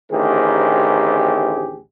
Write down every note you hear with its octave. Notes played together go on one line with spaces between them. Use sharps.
A1 D2 D#3 C4 G4 G#4